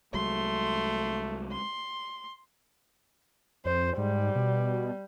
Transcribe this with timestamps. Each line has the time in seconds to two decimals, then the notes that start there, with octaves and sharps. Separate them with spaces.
0.14 C2 F#3 G#3 A3 C6
1.52 C6
3.65 F2 C5
3.97 G#2 G3
4.35 B2